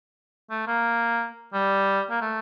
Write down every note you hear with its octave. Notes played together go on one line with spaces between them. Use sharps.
A3
A#3
G3
A#3
A3